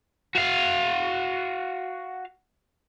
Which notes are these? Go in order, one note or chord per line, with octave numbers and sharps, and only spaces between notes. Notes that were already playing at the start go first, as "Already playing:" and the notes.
F#4 F5